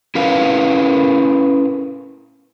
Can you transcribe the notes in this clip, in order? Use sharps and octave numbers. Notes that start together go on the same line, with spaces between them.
C#4 E4 A#4 B4 F5